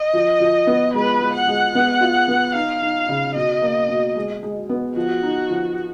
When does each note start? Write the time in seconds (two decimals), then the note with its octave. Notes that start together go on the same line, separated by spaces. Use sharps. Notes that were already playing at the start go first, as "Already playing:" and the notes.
Already playing: D#5
0.13 F3
0.40 F3
0.67 B3
0.93 G#3 B4
1.21 G#3
1.34 F#5
1.47 G#3
1.75 B3
2.01 F4
2.28 B3
2.55 D#4 F5
2.82 D#4
3.08 C#3
3.35 B2 D#5
3.62 A#3
3.89 B2
4.15 G#3
4.43 G#3
4.69 B3
4.96 F3 F#4
5.23 D#4
5.50 F3